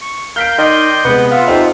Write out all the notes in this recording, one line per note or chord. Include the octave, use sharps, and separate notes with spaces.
C#6
A#4 F5 F6 G6 B6 D7
D#3 D5 D#5 C6
C3 G#3 B3 B4 F#5
F4 E5 F#5
F2 D#4 F4 G4